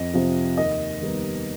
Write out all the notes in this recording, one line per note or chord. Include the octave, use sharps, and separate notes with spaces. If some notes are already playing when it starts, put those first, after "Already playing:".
Already playing: F2 D#5
C3 F3
D#2 D#5
D#3 G3 B3 D#4